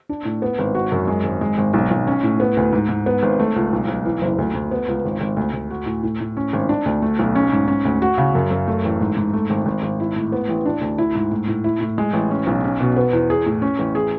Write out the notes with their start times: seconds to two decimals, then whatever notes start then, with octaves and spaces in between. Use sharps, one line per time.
0.09 D4
0.25 A2
0.42 B3
0.59 G#1
0.75 F#4
0.92 F#2
1.08 G#3
1.24 G#1
1.41 G#3
1.58 G#1
1.74 B1
1.91 B1
2.07 C#4
2.23 A2
2.40 B3
2.57 D2
2.73 G#2
2.89 G#2
3.06 B3
3.23 G#1
3.40 A3
3.56 C#2
3.72 B1
3.88 B1
4.05 E3
4.22 F#1
4.38 D2
4.54 D2
4.71 B3
4.88 C#2
5.05 G#1
5.21 G#1
5.36 D2
5.53 D2
5.70 F#4
5.86 A2
6.03 A2
6.20 A2
6.37 C#4
6.53 G#1
6.69 D4
6.86 D2
7.02 A3
7.19 B1
7.35 C#4
7.52 G#2
7.68 C#4
7.85 D2
8.02 F#4
8.18 C#3
8.35 F#2
8.51 F#2
8.68 A3
8.84 A1
9.01 G#2
9.17 G#2
9.33 A3
9.50 G#1
9.66 G#1
9.83 G#1
10.00 E4
10.16 A2
10.32 B3
10.49 A1
10.66 D4
10.81 D2
10.98 E4
11.15 G#2
11.31 A2
11.48 A2
11.64 E4
11.81 A2
11.98 G#3
12.13 A1
12.31 C#4
12.47 B1
12.64 C#4
12.80 B2
12.96 B3
13.13 E2
13.30 G#4
13.46 A2
13.62 C#4
13.79 A1
13.95 G#4